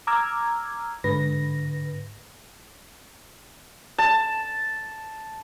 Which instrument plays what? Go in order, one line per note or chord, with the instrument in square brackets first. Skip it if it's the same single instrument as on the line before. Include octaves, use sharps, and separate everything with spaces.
[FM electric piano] A#5 D6 E6 F6 G#6
G#2 D3 B4 A#6
[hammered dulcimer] A5